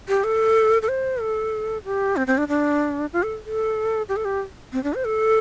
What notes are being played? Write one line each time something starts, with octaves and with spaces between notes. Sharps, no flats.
G4
A4
A4
C5
A4
G4
C4
C4
D4
D4
F4
A4
A4
G4
A4
G4
C4
D4
C5
A4